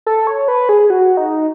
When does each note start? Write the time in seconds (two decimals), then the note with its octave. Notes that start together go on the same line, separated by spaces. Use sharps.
0.06 A4
0.27 C#5
0.48 B4
0.69 G#4
0.90 F#4
1.17 D#4